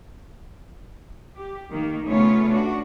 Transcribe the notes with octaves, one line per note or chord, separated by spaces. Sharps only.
G4
D#3 A#3
C#3 A3 B3 C#4 F4 C#5
D4 F#4